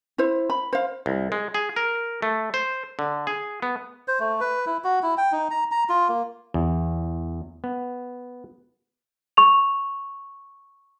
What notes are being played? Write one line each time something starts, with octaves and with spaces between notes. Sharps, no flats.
E4 C5
B5
C5 F5
C2
G#3
G#4
A#4
A3
C5
D3
G#4
B3
C5
A3
B4
E4
F#4
E4
G5
D#4
A#5
A#5
F4
A#3
E2
B3
C#6 F7